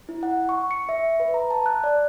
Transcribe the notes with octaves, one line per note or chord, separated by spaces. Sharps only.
E4
F#5
C#6
C#7
E5
B4
A#5
A5
F#6
D5